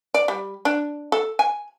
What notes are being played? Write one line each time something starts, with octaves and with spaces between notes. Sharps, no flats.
D5
G3
D4
A4
G#5